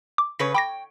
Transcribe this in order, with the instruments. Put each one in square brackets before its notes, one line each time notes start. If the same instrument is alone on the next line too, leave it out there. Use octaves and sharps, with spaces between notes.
[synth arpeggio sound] D6
[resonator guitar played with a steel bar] C#3 B4 C#5 [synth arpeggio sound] A#6
[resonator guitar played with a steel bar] G5 [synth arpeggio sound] B5 D6 A#6